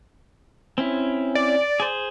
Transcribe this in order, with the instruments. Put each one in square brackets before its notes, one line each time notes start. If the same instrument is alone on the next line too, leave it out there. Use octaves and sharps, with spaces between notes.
[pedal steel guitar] C4 C#4 E4
[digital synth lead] D5
[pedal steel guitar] G#4 C5